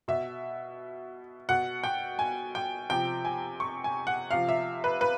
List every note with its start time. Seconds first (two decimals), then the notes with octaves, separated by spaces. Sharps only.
0.08 B2 E5
1.49 B2 F#5
1.84 G5
2.19 G#5
2.55 G5
2.90 C3 F3 G5
3.25 G#5
3.60 C#6
3.84 G#5
4.07 F#5
4.31 C3 F3 F5
4.48 E5
4.84 B4
5.01 B4